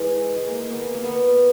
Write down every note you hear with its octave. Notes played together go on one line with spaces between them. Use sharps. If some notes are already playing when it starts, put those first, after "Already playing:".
Already playing: E3 G#3
G#3
A#3
A#3
B3
A#3
A#3
B3